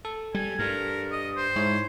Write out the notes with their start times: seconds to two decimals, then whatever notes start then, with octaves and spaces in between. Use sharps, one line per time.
0.05 A4
0.34 G3 G#5
0.59 G2 A#4
1.12 D#5
1.36 C5
1.56 G#2 E4 C#5